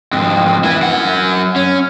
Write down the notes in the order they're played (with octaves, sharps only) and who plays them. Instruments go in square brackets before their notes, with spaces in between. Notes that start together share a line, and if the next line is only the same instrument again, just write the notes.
[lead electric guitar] F2 G#2
E4 B4
F#2 F#5
C#4